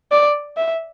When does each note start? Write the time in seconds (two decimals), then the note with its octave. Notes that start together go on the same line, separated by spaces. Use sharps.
0.11 D5
0.57 E5